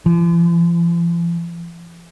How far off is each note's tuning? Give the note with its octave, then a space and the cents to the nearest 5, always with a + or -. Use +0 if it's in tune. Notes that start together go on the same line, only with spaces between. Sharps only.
F3 -45